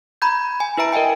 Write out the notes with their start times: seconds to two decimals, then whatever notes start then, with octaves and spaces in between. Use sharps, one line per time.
0.22 A#5 B5 G6 G#6
0.60 G#5
0.77 E4 B4 E5 A#5 D7
0.92 A#4 D#5 E5 G5 G#5